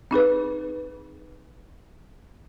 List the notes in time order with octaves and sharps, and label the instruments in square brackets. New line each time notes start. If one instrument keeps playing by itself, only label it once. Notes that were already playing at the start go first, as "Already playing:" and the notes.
[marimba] C4 D#4 G#4 B4